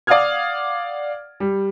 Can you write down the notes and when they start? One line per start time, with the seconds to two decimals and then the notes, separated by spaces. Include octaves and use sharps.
0.07 D5 F5 F#5 D#6 F6 G#6
1.40 G3